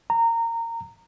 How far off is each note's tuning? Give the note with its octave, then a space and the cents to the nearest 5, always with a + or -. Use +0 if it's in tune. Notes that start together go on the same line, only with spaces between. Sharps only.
A#5 -20